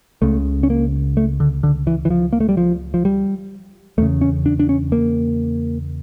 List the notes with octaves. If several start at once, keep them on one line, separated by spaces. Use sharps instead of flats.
C#2 C#3 A3
C#4
A#3
A3
D3
D3
E3
E3
F3
A#3
A3
G3
F3
F3
G3
E2 C#3 A3
C#4
D4
D4
C#4
A#3